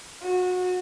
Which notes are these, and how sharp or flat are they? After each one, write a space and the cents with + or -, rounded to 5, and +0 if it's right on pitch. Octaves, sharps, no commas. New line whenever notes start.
F#4 -25